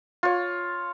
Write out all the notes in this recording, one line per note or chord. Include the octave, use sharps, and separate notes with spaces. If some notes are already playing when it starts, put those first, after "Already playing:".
F4 C#5